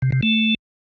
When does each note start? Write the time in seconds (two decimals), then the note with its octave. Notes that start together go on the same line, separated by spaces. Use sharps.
0.02 C3
0.12 C3
0.23 A3